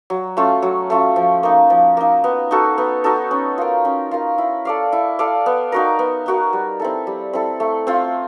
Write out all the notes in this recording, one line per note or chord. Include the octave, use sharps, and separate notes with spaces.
F#3
A3 C#4 F4
F#3
A3 C#4 F4
F3
A#3 D#4
F3
A#3 D#4
B3
D#4 F#4 A4
B3
D#4 F#4 A4
C#4
F4 A#4
C#4
F4 A#4
E4
A4 D5 F5
E4
A4 D5 F5
B3
D#4 F#4 A#4
B3
D#4 F#4 A#4
G3
C4 E4 A4
G3
C4 E4 A4
A3
C4 F4